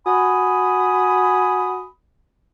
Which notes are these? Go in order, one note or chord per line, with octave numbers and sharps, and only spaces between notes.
F#4 G#5 B5 D#6